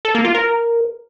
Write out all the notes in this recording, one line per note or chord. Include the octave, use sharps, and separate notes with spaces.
A4
A#3
F4
A#4